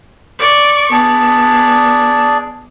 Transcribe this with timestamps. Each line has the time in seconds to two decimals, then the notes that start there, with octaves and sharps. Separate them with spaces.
0.39 D5 C#6
0.91 B3 D4 G#4 D5